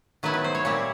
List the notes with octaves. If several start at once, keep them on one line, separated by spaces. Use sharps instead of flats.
D#3 F#3 B3 E4 B4
B4
C5
C#5
A#2 G3 C4 E4 C#5